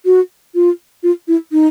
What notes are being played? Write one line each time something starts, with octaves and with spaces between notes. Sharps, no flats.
F#4
F4
F4
E4
D#4